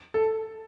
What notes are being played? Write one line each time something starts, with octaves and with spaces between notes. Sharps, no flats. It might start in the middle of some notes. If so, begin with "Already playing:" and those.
A4